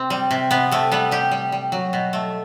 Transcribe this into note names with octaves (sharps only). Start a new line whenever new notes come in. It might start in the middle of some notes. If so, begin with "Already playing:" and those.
Already playing: C3 C4
G3
C3
C3 B3
C3 A3
G3 B3
G3 G4
G3
G3
F#3
B2
A3